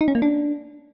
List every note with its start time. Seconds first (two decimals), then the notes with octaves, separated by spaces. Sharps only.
0.01 D#4
0.08 C#4
0.15 A#3
0.22 D4